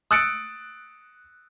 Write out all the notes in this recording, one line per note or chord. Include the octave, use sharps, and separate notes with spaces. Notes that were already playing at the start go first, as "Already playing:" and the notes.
D#6 E6 F#6 A6 C#7 D7